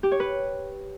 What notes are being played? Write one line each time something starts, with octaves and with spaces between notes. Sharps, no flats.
G4
C#5
B4